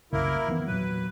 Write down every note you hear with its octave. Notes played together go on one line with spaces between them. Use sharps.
C2 F#2 C#3 A#3 E4 A#4
D#3 E3 B3
E2 A#2 F#3 B4